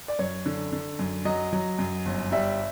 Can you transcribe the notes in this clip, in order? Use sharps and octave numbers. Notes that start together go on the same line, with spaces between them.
D5
F#2 C#5
D3
D3
F#2
F#3 D#5
F#3
F#2
G1
G3 E5